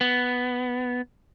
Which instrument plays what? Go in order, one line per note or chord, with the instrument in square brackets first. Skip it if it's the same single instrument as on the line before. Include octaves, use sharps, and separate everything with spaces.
[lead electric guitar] B3